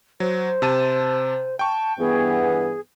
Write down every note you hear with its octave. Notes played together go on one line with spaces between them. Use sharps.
F#3 C5
C3 A5 D#7
G5 A5 C#6
G2 E3 B3 G#4